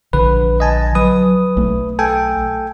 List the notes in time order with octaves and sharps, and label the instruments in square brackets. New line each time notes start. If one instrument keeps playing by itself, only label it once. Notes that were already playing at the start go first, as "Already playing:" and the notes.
[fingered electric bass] A#1 D3 [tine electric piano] B4
[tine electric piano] D#5 G#5 A5
[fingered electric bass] F#3 [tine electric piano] B4 D#6
[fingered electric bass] B1 A3
[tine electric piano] A4 G5 G#5